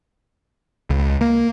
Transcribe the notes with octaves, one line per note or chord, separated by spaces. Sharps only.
C#2
A#3